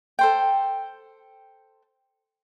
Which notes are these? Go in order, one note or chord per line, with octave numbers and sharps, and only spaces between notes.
A4 C5 G5